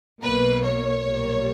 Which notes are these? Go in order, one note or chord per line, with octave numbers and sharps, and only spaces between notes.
B1 B2 A#3 B4
C#5
B1 A#2 G3 A#3